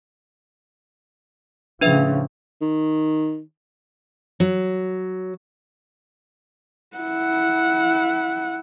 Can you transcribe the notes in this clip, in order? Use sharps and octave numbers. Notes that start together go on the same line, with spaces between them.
A2 C#3 F3 D4 B4 E5
D#3
F#3
E4 F#5